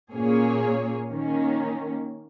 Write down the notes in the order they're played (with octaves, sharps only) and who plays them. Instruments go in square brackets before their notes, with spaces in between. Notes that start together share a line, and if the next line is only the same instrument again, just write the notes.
[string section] A#2 A#3 C#4 G#4 C#5
D#3 A#3 C#4